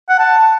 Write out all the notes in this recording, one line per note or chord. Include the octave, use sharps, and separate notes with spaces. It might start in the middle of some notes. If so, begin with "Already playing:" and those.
F#5
A5